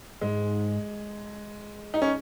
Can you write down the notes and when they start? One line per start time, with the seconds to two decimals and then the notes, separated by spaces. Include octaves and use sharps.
0.21 G#2 G#3
1.94 D#4
2.02 C#4